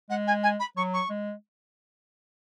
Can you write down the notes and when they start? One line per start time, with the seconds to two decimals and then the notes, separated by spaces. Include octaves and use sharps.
0.10 G#3 F#5
0.27 G#5
0.43 G#5
0.59 B5
0.77 F#3 C#6
0.93 C#6
1.10 G#3